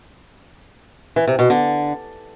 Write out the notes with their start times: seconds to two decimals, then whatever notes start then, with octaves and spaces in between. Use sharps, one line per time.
1.16 E3
1.27 C3
1.39 B2
1.50 D3